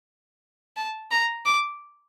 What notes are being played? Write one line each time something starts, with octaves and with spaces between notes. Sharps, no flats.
A5
A#5
D6